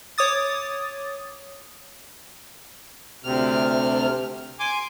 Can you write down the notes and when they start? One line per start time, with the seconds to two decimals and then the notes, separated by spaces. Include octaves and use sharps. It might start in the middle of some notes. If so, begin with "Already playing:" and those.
0.18 C#5 D6 D#6 A6
3.24 D2 C3 F6
4.60 G#5 C6 D6